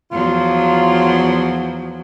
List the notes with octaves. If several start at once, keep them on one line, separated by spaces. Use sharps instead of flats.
E2 F3 F#3 F4